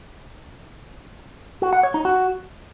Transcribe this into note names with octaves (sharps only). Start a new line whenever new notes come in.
F#4
F#5
C#5
D#4
F#4